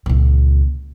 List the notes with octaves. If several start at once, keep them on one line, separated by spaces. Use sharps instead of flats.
C#2 A#2